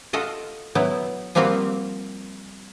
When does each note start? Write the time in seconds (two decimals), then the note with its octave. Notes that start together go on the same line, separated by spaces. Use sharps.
0.13 F4 F#4 A4 D#5
0.75 F#3 B3 E4
1.35 F3 G3 A#3 C4 F4 F#4